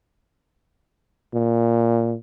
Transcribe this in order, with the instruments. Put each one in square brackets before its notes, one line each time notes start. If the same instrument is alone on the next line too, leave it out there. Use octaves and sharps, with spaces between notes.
[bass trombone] A#2